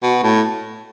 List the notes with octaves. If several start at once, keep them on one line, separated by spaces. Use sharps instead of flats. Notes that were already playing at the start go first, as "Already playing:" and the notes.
B2
A2